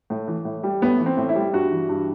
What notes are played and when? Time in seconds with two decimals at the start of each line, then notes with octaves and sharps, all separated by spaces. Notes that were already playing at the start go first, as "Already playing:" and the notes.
0.10 A2
0.28 E3
0.45 A2
0.63 G3
0.82 A2 B3
1.00 E3
1.06 C4
1.17 A2
1.29 E4
1.36 G3
1.53 G2 F#4
1.71 E3
1.89 G2